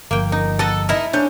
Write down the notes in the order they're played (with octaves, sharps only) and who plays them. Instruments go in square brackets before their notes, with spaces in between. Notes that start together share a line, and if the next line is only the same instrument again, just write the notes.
[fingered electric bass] G1 F3 [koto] A#3 G5
[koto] D#4
[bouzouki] A4 [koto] D#5 F#5 [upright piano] A6
[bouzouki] D#4 A#4 [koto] E4
[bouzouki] C#4 [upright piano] D4 G6